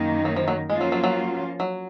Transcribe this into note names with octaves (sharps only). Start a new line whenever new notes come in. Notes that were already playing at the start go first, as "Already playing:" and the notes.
Already playing: F#2 D#3 A#3 D#4
F#3
F3
F#3
F3 G#3 A#3 C#4 F4
F#3
F#3
F#3
F#3